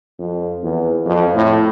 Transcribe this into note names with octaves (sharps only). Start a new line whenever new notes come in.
F2
E2
F2
A2